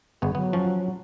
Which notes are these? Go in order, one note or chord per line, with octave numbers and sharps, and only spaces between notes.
G1 B3 G#4
F#3 B3
F3 C#4